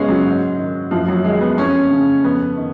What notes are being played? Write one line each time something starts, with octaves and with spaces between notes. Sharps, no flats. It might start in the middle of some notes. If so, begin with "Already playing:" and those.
Already playing: F#2 C#3 G#3 B3 C#4
F#3
G#2
D#3
F#2 F3
F#3
D#3 G#3
B3
F2 C#4
C#3
F2 B3
D#3